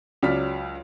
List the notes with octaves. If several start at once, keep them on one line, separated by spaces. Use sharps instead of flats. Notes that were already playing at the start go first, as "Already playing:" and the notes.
C#2 C#3 F#3 D5 F6 B6